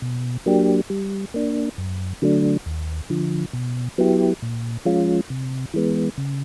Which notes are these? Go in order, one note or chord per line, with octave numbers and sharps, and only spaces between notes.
B2
F#3 A#3 D4 G4
G3
A#3 D4
F#2
D3 F#3 A3 D4
D#2
D3 F3
B2
F#3 B3 E4 G4
A#2
F3 G#3 C#4 F4
C3
E3 G#3 B3
C#3